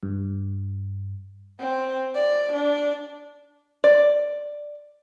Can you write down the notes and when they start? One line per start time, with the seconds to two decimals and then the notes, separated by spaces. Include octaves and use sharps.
0.03 G2
1.60 C4
2.15 D5
2.53 D4
3.84 D5